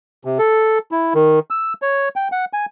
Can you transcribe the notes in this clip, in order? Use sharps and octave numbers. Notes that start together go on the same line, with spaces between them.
C3
A4
E4
D#3
E6
C#5
G5
F#5
G#5